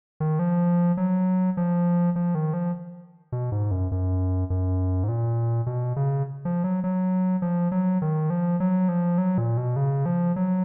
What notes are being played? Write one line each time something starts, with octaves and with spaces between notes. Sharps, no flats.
D#3
F3
F#3
F3
F3
D#3
F3
B2
G#2
F#2
F#2
F#2
G#2
A#2
B2
C#3
F3
F#3
F#3
F3
F#3
D#3
F3
F#3
F3
F#3
A#2
B2
C#3
F3
F#3